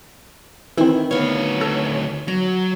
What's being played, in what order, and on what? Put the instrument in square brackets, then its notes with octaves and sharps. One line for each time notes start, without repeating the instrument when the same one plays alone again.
[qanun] D#3 E4 [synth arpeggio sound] E3 C4
[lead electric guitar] D2 C#5 [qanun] B3 F5
[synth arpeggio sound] A4 [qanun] A#5
[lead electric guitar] F#3 [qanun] A#5